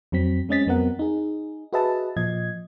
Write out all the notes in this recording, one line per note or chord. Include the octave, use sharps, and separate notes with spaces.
F2 F#3 C4 B6
G#3 C4 C#4 D#5 A6 B6
F2 F#3 B3 C4 A#4 F#5
D#4 G#4
F#4 G#4 B4 D#5 E5 A5
A#2 F3 D#5 G#6